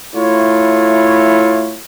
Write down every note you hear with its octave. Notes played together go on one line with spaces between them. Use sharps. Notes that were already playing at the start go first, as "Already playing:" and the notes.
A3 E4 F4 C#5